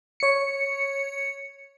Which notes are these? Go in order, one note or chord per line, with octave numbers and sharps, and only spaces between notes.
C#5 C#7